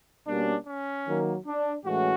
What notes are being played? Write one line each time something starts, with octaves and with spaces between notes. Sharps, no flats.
B2 G3 A#3 C#4 D4
C#4
D#3 F#3 A#3
D4
A2 E3 G#3 C#4 F#4